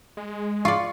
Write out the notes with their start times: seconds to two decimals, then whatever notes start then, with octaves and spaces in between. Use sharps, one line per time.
0.17 G#3
0.65 F4 D5 C#6